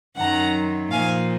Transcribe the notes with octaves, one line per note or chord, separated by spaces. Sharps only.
F#2 D#3 F#3 F#5 A#5
A#2 F3 F5 G#5